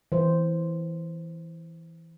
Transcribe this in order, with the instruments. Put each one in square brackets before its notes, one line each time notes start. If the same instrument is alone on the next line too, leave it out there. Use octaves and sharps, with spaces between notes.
[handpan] E3 C5